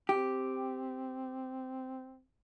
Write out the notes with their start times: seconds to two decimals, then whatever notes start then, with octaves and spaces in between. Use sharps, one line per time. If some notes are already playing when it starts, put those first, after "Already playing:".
0.09 C4 G4